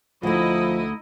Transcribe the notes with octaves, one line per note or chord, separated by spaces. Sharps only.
D2 F3 A3 D#4 E4 D#5